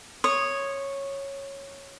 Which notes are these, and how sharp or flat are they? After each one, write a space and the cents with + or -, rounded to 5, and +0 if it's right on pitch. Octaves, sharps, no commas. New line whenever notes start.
C#5 -5 D#6 -15